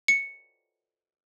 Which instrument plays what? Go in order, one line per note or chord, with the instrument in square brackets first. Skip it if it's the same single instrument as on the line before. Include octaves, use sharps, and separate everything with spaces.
[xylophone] C#7